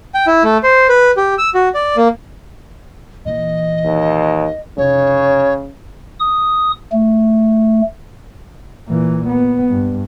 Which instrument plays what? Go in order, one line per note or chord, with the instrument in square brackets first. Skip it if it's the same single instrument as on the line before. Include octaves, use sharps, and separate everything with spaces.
[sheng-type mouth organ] G5
E4
A3
C5
B4
G4
E6
F#4
D5
A#3
[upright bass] A#2 E3 [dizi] D#5
[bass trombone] D#2
[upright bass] F1 [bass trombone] C#3 [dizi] C#5
[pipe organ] D#6
A3
[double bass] A#2 E3
B3
G2